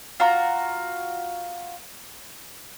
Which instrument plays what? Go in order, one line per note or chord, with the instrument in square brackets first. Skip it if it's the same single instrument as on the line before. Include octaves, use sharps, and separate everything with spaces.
[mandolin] F4 F#4 A#5